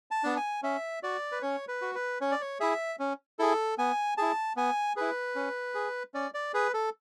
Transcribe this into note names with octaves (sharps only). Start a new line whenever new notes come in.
A5
B3 D4
G#5
C#4 E5
F#4 D5
B4
C#4 C#5
B4
F#4
B4
C#4 C#5
D5
C#5
E4 G#4 E5
C#4
E4 G#4 A4
B3 G#5
E4 G#4 A5
B3 G#5
E4 G#4 B4
C#4
G#4
C#4 D5
D5
G#4 B4
A4